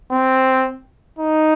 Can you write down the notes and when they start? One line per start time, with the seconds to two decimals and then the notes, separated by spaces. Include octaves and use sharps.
0.11 C4
1.19 D#4